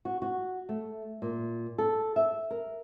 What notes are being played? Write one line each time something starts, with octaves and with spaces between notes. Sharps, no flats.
F#4
F#4
A3
A#2
A4
E5
A#4